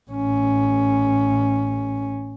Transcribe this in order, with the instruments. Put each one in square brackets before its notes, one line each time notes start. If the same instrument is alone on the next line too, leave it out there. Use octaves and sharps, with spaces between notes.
[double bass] A1 C#4